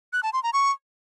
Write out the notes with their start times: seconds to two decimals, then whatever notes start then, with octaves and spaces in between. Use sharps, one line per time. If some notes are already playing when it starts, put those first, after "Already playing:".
0.13 F#6
0.23 A5
0.33 C6
0.43 A#5
0.53 C#6